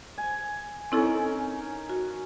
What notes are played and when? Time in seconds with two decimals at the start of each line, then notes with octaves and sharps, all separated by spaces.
0.18 G#5
0.92 C4 C#4 D#4 E4 A4 A#4
1.89 F#4